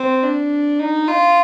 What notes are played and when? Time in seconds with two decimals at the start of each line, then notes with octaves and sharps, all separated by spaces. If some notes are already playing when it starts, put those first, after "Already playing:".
Already playing: C4
0.23 D4
0.80 D#4
1.08 F4